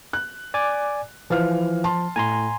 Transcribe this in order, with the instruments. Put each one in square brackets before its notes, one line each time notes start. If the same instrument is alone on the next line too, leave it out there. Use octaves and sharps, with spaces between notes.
[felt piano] F#6
[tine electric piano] D5 G#5 D6
[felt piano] E3 F5 F6 [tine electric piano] F3
[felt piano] A5 C6
[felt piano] A2 [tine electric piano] G#5 A#5 C6